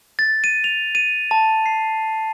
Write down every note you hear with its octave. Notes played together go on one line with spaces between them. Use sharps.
A6
D#7
F7
D#7
A5
C7